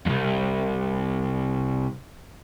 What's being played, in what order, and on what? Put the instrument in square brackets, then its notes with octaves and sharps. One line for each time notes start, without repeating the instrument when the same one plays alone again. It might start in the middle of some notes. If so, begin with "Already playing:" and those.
[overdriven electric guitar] C2 F2